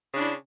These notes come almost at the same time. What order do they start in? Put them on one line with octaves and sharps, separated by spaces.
C#3 D4 E4